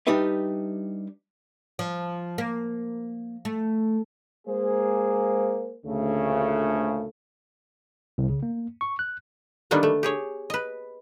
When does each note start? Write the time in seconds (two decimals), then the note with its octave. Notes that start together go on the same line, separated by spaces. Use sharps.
0.07 G3 D4 D#4 G4 B4 E5
1.79 F3
2.38 A#3
3.45 A3
4.47 G#3 A#3 G#4 C5
5.85 D2 A#2 C#3 A3
8.18 C2
8.29 C#3
8.43 A#3
8.81 C#6
8.99 F#6
9.71 D3 D#3 G3 A#3 B3 D4
9.83 A3
10.03 G4 G#4 C#5
10.50 B4 D#5